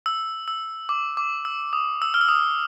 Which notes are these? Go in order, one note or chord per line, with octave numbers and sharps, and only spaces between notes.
E6
E6
D6
D6
E6
D#6
E6
F6
E6
D#6